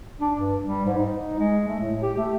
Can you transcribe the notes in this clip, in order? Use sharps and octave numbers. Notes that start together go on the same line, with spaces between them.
D4
G2
G3
G#2
D#4
G#3
A3
A2
G4
A3